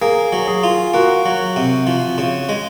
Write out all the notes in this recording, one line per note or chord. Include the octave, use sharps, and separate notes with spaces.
A#3 G#4
F#3
G#4
F4
A#3 F#4
F#3
C3
F3
C#3
G#3